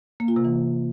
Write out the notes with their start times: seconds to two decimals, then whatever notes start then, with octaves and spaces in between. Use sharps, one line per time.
0.20 A#3
0.28 F4
0.36 C3
0.45 E3